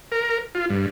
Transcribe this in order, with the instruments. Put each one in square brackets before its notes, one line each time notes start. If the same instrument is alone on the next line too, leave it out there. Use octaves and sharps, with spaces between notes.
[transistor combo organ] A#4
F4
G2